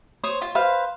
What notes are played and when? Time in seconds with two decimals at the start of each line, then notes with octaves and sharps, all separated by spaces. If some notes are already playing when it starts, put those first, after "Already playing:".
0.24 C5 C#5 D#6
0.42 F4
0.55 B4 C5 F5